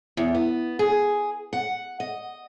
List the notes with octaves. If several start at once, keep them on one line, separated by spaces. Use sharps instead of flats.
E2
B3
G#4
F#5
D#5